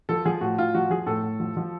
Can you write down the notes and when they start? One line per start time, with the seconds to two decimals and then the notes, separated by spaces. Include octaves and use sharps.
0.09 F3 A4
0.25 F3 G#4
0.41 A2 F#4
0.58 A2 F4
0.75 F3 F#4
0.90 F3 G#4
1.07 A2 A4
1.23 A2
1.40 F3
1.57 F3